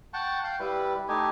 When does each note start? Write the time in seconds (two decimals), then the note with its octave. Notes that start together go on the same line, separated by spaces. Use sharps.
0.14 F#5 G5 A5 C#6
0.44 F5 G5
0.60 G3 E4 B4
1.08 A3 D#4 G4 G#5